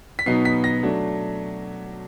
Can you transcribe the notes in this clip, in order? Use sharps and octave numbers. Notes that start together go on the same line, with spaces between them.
B6
B2 F#3 B3 D#4 C7
B6
A#6
F#3 A3 D4